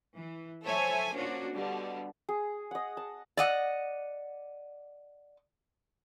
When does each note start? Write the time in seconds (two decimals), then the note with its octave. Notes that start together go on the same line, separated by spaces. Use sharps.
0.14 E3
0.64 A4 C5 C#5 E5 G#5
1.13 F3 A#3 C#4 D4 F#4
1.53 B2 D3 G3
2.29 G#4
2.71 D#5 F#5
2.97 A5
3.37 D5 D#5 F#5